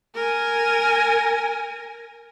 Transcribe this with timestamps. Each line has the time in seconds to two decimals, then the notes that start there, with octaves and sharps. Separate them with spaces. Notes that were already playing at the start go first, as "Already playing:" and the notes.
0.15 A#4 G#5